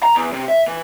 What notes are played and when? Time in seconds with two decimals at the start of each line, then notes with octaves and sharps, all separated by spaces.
0.04 A#5
0.16 E2
0.34 C3
0.49 E5
0.68 E3